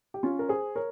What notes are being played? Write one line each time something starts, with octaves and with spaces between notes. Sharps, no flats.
G4
C#4 F4
A#4
G#4 C5
A#4 C#5